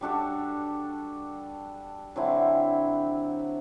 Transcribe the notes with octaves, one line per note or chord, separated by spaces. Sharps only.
G3 D4 F#4 A4
D3 F#3 C4 E4